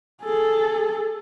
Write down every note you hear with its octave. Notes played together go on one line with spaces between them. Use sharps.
G#4 A4